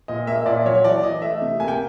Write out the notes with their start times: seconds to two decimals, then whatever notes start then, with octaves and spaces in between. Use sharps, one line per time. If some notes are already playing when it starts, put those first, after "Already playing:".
0.08 A#2 D#5
0.27 A#3 E5
0.46 A#2 D5
0.66 F#3 C#5
0.84 E3 D5
1.03 E3 D#5
1.22 A3 E5
1.42 C3
1.60 A#3 G#5
1.68 G5